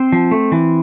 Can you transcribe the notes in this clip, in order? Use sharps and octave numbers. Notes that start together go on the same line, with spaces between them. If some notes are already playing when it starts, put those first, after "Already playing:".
Already playing: C4 C5
F3
A3
E3